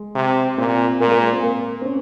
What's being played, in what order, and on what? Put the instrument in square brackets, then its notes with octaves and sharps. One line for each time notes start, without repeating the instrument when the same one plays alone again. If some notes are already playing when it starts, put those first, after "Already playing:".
Already playing: [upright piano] G#3
[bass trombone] C3
[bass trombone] A#2 [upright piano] C4
[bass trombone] A#2 [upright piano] A#3
[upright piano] G#3
A#3
G#3
C4
A#3
C4
C#4